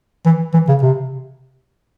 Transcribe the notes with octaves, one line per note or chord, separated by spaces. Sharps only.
E3
E3
C#3
C3